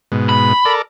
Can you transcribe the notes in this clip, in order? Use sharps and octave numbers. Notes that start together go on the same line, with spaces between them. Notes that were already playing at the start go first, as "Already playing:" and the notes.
G#2 B2
B5
A4 A#4 D5